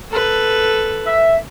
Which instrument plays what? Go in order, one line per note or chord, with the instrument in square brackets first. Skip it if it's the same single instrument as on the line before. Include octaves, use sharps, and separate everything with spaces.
[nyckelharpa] A4 B4
[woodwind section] E5